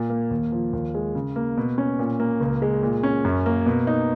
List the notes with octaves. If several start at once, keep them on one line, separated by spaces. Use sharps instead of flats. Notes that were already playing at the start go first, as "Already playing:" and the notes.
Already playing: A#2
A#3
D#2
F3
D#2
G#3
C#3
A#3
B2
C#4
A#2
A#3
C#2
G#3
A#2
C#4
F#2
A#3
B2
D#4